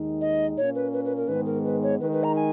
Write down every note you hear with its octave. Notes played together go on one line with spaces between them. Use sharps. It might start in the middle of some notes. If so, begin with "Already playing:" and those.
Already playing: D#2 D#3 G#3 D#4
D#5
A#2 A#3 C#4 C#5
B4
B4
B4
A#4
G#2 D#3 G#3 B3 B4
A#4
B4
C#5
D#3 G#3 D#4 B4
B4
A#5
G#5